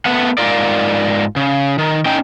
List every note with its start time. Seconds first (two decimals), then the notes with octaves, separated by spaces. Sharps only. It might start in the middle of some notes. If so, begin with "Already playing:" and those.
0.06 A3 B3 F#5
0.38 G#2 F4 A#4 D5
1.36 C#3
1.78 D#3
2.06 C#4 D#4 G5